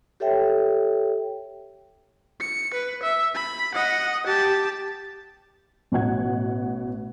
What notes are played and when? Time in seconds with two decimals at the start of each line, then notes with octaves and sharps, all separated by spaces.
0.20 G4 A4 C#5 E5 G5
2.40 C#7
2.74 B4
3.03 E5
3.34 B5
3.75 D#5 F#5
4.27 G4 A5
5.92 A1 B2 F#5 G#6